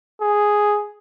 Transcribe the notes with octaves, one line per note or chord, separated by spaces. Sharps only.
G#4